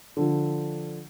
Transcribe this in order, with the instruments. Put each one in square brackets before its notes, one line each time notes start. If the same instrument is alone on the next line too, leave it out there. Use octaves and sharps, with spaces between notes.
[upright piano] D3 F3